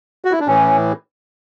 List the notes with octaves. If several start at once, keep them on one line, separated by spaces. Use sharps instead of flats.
F#4
E4
D4
A2 E3 C#4